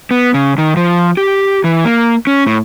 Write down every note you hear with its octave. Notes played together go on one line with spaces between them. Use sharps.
B3
C#3
D#3
F3
G4
E3
A#3
C#4
A2